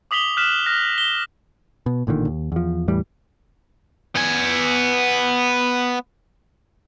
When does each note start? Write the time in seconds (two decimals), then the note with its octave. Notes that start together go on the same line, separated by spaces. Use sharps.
0.11 D6 D#6 B6 F7 G7
0.37 F6 F#6 B6 E7
0.66 F6 F#6 A#6 G7
0.98 G7
1.86 B2
2.07 A1 A#2 D3 D#3
2.27 D#2
2.52 E2 F3
2.88 E2 A2 E3 G3
4.15 B3 G#5